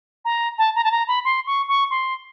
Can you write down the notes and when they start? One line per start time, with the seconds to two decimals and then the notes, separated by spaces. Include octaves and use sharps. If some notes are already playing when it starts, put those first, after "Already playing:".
0.25 A#5
0.58 A5
0.75 A#5
0.84 A5
0.91 A#5
1.08 B5
1.25 C6
1.47 C#6
1.68 C#6
1.90 C6